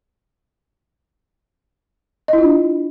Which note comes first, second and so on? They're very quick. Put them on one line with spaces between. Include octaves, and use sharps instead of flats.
D#5 E4 F4 D4